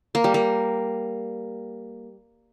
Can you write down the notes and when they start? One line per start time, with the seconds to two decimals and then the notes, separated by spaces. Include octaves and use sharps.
0.15 A#3
0.24 G3
0.34 A#3